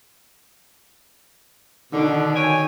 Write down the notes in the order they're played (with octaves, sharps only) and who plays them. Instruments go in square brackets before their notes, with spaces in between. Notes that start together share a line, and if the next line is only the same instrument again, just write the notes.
[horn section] B2 D3 [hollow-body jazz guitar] D#3
[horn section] C#5 G5 G#5